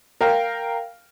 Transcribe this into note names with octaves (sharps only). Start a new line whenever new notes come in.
A#4 F5 G5